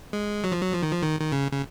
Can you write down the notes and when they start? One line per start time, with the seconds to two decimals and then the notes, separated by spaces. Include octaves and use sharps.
0.13 G#3
0.44 F#3
0.52 F3
0.61 F#3
0.73 F3
0.82 D#3
0.92 F3
1.03 D#3
1.21 D#3
1.32 C#3
1.51 C#3